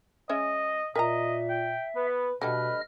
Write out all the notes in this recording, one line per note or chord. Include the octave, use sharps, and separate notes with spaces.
G#3 C#4 D#5 E5
A#2 A#4 D#5 E5 G#5 A#5
G5
B3 B4
B2 D3 G3 A3 B4 D#5 F6